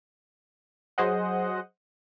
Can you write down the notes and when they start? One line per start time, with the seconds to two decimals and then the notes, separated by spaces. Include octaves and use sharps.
0.98 F#3 G#4 C5 D#5 F#5